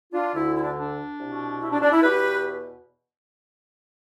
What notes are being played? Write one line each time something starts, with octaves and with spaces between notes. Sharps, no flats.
D4 F4
D2 D3 E4
E4
D4
D4
C2 B2
E4
D4
D4
E4
E2 B2 G4 B4